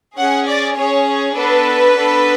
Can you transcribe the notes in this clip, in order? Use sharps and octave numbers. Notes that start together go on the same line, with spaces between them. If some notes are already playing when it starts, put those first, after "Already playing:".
C#4 G#4 F#5
D5
C#4 G#4 C#5
B3 D4 A4 B4
B3 D4 A4